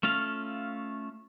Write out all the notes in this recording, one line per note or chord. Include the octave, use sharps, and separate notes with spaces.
A3 C#4 F4 F5